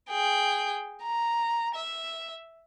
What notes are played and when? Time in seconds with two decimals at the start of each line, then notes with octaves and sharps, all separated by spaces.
0.10 G#4 G5
1.03 A#5
1.76 E5